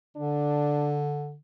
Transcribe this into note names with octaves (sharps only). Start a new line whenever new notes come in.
D3 D4